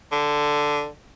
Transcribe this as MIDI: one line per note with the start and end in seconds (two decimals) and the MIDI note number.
0.12 0.87 50